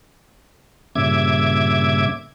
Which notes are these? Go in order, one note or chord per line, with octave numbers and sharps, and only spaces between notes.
G2 A#2 C#3 E5 D6 G#6